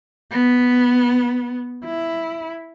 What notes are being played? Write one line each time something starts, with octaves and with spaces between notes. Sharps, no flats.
B3
E4